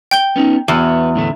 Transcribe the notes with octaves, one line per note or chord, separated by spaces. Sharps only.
G5 G6 G7
B3 C#4 D#4
E2 B3 F#4
A2 D3 A3